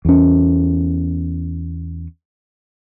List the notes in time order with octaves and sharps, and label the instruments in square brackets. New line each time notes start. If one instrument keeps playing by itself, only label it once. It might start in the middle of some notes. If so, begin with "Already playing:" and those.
[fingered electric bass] E2 C#4